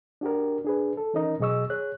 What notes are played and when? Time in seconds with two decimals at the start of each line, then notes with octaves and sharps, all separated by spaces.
0.21 D4 F#4 G4 A#4
0.64 D4 G#4 B4
0.97 A4
1.14 E3 C#4 D#4 A#4 D#5 A#5
1.40 B2 F#3 G#4 D#5 C#6 E6
1.70 G#4 C#5 F#6